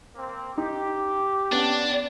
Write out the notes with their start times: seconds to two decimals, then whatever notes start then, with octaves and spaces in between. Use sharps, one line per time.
0.16 A#3 C4
0.58 D#4 G4
1.52 B3 C#4 D4 F#5